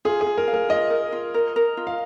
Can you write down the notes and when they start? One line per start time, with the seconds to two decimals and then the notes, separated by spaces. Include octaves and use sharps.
0.05 F4 G#4
0.21 G#4
0.26 F4
0.38 A#4
0.48 F5
0.53 A#4
0.69 F4 D#5
0.90 A#4
1.12 F4
1.34 A#4
1.56 A#4
1.77 F4
1.87 F5